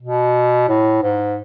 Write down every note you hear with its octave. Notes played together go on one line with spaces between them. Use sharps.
B2
A2
G#2